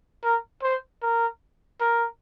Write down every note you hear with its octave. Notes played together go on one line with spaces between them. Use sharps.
A#4
C5
A#4
A#4